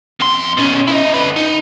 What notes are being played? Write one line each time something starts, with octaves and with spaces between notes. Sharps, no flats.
F2 C6
B2 C#4
E4 D#5
D3 B4
D#4